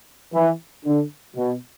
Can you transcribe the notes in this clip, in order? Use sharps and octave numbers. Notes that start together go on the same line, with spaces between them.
E3
D3
B2